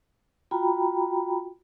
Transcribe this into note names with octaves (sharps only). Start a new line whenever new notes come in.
F4 F#4 G5 A#5 B5